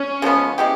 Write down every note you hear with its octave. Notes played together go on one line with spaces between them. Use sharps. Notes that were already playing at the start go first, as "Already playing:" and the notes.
Already playing: C#4
C#3 F3 G#3 B3
G#3 B3 E4 G4